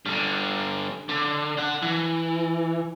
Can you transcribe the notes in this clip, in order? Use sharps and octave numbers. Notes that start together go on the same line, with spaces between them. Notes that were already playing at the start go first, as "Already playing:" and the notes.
G2 D3
D3
D3 F#5
E3